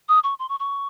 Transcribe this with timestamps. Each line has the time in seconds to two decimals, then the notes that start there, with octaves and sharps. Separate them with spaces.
0.09 D#6
0.24 C#6
0.39 C6
0.49 C#6
0.60 C#6